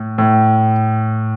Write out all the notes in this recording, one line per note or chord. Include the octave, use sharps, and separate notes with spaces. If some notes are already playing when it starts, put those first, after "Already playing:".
Already playing: A2
A2